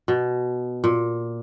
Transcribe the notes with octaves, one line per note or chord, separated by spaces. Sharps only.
B2
A#2